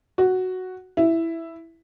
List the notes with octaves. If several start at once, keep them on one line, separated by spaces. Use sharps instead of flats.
F#4
E4